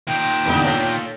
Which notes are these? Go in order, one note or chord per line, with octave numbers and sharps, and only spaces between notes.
A#2 D#3 G5
E2 G2 D3 D#4 G4 B4
D4 F4 A4 C#5 A#6 B6